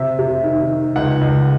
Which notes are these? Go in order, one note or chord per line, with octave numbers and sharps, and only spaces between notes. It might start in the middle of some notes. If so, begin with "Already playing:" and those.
Already playing: C3 E5
C3
D#3
D#3
C#2 F#5
C#2